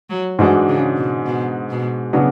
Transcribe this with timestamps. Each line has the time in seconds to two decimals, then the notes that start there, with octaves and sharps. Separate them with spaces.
0.10 F#3
0.39 G#2 E3 G#3 D4 F#4
0.68 C#3
0.97 B2
1.26 B2
1.70 B2
2.13 C#3 F#3 B3 D4 F#4